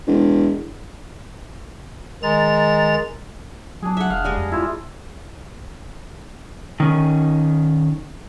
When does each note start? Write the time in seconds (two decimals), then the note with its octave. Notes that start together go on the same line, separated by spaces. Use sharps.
0.07 E1
2.23 D#3 G#3 A#5 A6
3.82 F#3 D4 G#4
3.97 E5 F#5
4.10 E1 F5
4.25 G3 G#3 D#5
4.37 F2
4.52 E4 F4
6.80 D#3 C#4